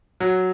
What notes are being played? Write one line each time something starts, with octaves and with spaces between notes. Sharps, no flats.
F#3